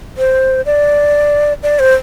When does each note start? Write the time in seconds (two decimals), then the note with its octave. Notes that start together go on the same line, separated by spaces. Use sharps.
0.18 C5
0.66 D5
1.63 D5
1.79 C5